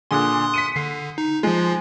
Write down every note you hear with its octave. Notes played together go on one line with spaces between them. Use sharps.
A#2 D3 G#4 C6 D#6 F#6
B6 C#7 D#7
D3 C7
D#4
F3 G#3 F4